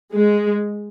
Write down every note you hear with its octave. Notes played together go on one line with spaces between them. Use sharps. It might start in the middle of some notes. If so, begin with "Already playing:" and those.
G#3